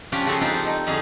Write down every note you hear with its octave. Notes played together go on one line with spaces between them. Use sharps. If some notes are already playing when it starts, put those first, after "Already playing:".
F3 C#4 D4 F4 G4
C#3 F3 F#4 G#4 A4
C4 D4 D#4 F4 G4
F3
D#4
F2 D3 D#4 G#4 F5